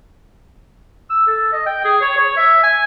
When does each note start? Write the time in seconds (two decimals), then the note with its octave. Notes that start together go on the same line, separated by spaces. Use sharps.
1.10 E6
1.27 A4
1.53 D#5
1.66 G5
1.84 G#4
2.01 C#5
2.17 C#5
2.37 E5
2.63 G#5